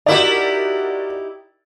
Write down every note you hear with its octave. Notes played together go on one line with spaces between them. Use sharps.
D#4 E4 F#4 G4 A#4 D5